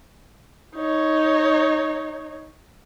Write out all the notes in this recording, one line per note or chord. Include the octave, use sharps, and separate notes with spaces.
D#4 C#5